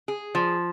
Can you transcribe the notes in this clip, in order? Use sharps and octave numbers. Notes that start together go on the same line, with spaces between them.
G#4
F3